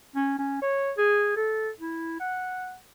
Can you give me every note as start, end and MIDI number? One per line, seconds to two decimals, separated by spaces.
0.16 0.37 61
0.38 0.57 61
0.62 0.91 73
0.97 1.31 68
1.36 1.70 69
1.80 2.19 64
2.20 2.74 78